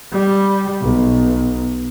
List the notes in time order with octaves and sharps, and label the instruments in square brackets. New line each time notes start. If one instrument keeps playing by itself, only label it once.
[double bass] G3
B1